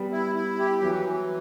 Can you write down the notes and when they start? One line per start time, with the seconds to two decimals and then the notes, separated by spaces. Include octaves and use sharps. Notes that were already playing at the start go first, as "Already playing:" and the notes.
Already playing: G3 B3
0.12 E4
0.35 E4
0.59 G4
0.82 E3 F#3
1.05 E3